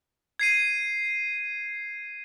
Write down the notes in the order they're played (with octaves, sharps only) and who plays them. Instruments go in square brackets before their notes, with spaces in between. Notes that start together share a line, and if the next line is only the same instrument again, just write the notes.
[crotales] G#6 C7 D#7